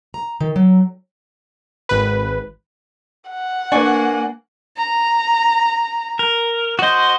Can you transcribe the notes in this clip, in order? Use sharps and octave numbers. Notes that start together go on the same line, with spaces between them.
A#5
D#3
F#3
G#1 B4
F#5
A#3 D4 B4 G#5 C#6
A#5
A#4
F#4 C5 D#5